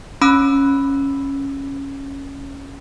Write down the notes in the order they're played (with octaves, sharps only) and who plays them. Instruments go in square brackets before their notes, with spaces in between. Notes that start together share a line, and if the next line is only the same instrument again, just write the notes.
[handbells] C#4 B5 E6 F#6